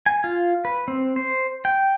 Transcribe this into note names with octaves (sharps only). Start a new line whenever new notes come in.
G#5
F4
B4
C4
C5
G5